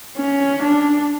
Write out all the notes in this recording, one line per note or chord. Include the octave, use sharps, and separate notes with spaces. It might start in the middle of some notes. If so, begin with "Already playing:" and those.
C#4
D4